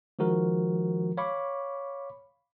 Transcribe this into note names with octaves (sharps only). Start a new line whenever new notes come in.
D#3 F3 G#3 F#4 A#4
C#5 F5 B5 C#6 D6